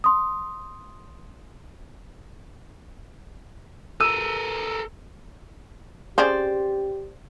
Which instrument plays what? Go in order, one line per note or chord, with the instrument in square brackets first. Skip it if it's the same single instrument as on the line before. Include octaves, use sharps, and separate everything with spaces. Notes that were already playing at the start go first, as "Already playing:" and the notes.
[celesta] C6 D#6
[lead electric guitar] A4 A#4 [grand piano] E6 [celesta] D#7
[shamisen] C4 C#4 G#4 [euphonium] G4 [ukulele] C5 D5